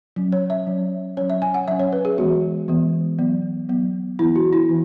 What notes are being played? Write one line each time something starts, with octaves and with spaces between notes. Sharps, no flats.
F#3 C#4
C#5
E5
F#3 C#4
F#3 C#4 C#5
E5
G#5
F#5
F#3 C#4 E5
C#5
B4
G#4
E3 G#3 B3 F#4
E3 G#3 B3
F#3 B3
F#3 B3
E3 B3 E4
F#4
E4
E3